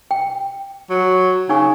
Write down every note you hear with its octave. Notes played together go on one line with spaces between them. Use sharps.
G5
F#3
C#3 D#4 G#5 C#6